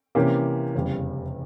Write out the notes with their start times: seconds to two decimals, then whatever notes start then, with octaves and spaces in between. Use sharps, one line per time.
0.15 C3 E3 A#3 C#4 G4
0.75 F1 E2 C#3 G3